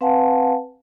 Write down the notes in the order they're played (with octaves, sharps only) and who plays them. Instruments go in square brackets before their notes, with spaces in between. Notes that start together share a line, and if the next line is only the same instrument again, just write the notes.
[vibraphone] C4 B4 F5 F#5 G#5 A5